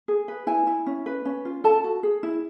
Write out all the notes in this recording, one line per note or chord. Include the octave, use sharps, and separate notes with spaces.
G#4
B4
E4 G#5
E4
C#4
B4
C#4
F4
A4 A5
F#4
G#4
E4